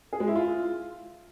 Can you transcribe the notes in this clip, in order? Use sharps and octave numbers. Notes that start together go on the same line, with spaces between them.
G#4
G#3
E4
F4